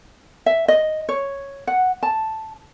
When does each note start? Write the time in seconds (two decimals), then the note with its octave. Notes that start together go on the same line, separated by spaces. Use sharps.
0.46 E5
0.68 D#5
1.09 C#5
1.67 F#5
2.03 A5